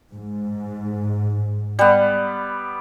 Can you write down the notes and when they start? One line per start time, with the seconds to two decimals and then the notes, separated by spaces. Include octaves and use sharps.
0.15 G#2
1.79 G3 B3